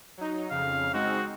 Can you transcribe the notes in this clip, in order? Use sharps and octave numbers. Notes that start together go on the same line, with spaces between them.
F#3 D#4
F2 C#3 F5
G#3 C4 D#4 F#4